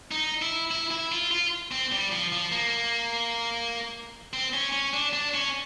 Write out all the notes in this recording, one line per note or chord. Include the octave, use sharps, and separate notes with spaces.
D#4
E4
E4
E4
F4
F4
C4
G3
F3
F3
A#3
C4
C#4
C#4
D4
D4
C#4